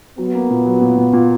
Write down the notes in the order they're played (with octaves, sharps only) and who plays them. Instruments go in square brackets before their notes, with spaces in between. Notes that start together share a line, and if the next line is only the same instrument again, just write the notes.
[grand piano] F#3 [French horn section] B3
[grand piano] A#3
A#2
F#3
A#2
A#2
A#2